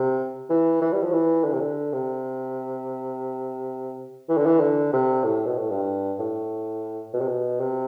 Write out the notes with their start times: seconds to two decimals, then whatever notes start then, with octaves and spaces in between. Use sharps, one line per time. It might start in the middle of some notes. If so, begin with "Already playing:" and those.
Already playing: C3
0.50 E3
0.82 E3
0.92 G3
1.03 F3
1.13 E3
1.44 D3
1.53 C3
1.60 D3
1.93 C3
4.29 E3
4.37 D3
4.46 E3
4.60 D3
4.93 C3
5.23 A2
5.46 B2
5.58 A2
5.71 G2
6.19 A2
7.13 B2
7.21 C3
7.28 B2
7.60 C3